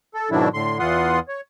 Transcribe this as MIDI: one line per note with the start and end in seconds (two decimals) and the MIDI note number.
0.14 0.30 69
0.31 0.48 44
0.31 0.48 47
0.31 0.48 51
0.31 0.48 54
0.31 0.48 62
0.31 0.48 64
0.54 0.78 45
0.54 0.78 50
0.54 0.78 84
0.79 1.19 40
0.79 1.19 52
0.79 1.19 65
0.79 1.19 78
0.79 1.19 84
0.79 1.19 87
1.28 1.41 73